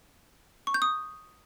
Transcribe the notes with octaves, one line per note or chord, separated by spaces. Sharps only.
C#6
G6
D#6